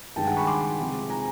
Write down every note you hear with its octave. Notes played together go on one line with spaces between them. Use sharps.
G2 D#3 G#3 G5 A5
F#5 G#5
B5 C#6
C6 D6
C3 F3 G#3
G#5 A#5